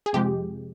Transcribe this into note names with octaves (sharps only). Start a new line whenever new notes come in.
G#4
F2 C3 F3 G#3 G4